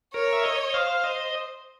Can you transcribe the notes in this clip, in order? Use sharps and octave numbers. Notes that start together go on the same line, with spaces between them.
A#4 C#5
E5
D#5
C5 F5
D#5